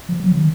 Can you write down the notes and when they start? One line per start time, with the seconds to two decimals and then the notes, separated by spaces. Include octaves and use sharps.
0.09 F3
0.20 F#3
0.32 D#3